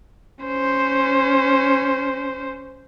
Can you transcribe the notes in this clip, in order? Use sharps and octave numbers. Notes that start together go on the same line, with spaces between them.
C#4 C5